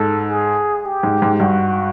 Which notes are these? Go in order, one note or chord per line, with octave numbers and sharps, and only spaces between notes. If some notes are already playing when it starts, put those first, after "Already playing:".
Already playing: G#2 A4
G#4
G4
G#2
G#2
G2 F#4